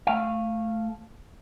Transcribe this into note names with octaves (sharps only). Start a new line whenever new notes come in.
A3 F5